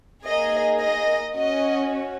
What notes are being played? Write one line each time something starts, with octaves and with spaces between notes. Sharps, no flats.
A#3 D#4 G#4 D#5
D#5
C#4 F#4 D#5